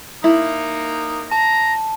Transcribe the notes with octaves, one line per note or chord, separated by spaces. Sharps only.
A#3 D#4 E4
A5 A#5